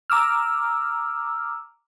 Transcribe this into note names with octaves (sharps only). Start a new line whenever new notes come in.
A#5 D6 E6 F6